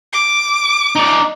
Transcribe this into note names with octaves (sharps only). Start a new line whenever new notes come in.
D6
D#4 D5